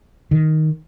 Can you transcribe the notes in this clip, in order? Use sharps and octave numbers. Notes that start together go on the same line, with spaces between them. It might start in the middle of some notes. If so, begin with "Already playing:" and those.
D#3